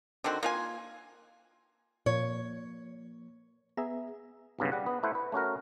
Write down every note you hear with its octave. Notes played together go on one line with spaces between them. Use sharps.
D3 D#3 C4 F#4
A#3 F4 G#5
A#2 F3 A#3 C#5
B3 G#4 E5 A#5
B1 G2 C#3 B3
G3 F#5
B3
A3 E4 C5 F#5
B4
A3 C#4 F#4 A#4